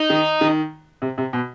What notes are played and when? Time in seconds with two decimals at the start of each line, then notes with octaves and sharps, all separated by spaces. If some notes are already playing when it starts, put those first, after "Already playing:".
Already playing: D#4
0.10 D#3
0.41 D#3
1.02 C3
1.18 C3
1.33 B2